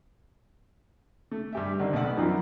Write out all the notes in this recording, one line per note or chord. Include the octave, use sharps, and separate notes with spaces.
A3
G2 G4 E5
D3 D#3 C4
B1 A2 D5 F#5 E6
B3
F#2 E3 F3 C4 D#4